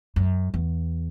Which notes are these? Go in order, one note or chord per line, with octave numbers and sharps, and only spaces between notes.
F#2
E2